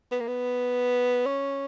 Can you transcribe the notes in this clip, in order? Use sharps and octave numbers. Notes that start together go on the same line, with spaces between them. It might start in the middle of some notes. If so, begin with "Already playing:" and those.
B3
A#3
B3
C#4